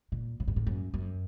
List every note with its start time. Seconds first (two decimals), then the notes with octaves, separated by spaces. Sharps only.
0.12 A#2
0.40 A2
0.48 G#2
0.56 A2
0.67 F#2
0.94 F#2